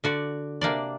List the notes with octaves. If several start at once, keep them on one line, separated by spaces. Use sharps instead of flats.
D3 F#4 D5
C3 A#3 D4 D5